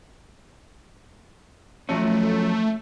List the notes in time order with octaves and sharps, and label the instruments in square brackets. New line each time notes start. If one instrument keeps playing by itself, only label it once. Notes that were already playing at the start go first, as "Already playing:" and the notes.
[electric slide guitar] F3 F#3 C#4 [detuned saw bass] A3